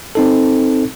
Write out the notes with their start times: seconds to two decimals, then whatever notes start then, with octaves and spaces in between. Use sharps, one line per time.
0.15 C4 D#4 A4